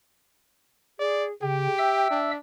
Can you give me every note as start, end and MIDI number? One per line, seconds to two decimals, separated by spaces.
0.99 1.31 68
0.99 1.25 74
1.42 1.68 49
1.42 2.07 67
1.42 2.17 79
1.78 2.31 76
1.78 2.31 88
2.11 2.38 62